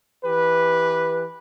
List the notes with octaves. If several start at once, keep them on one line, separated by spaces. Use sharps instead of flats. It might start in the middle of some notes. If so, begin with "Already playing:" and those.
E3 G4 B4